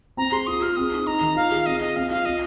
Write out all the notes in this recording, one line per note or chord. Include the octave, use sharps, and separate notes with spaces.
C4 A#5
G#4 C6
F4 D#6
G#4 F6
C4 D#6
D#4
D#4 A#5
D#3
F4 F5
G#4
C4 D#5
F4 D#5
C4 F5
F4 F5
C4 D#5